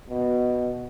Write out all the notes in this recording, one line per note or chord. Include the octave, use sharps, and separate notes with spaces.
B2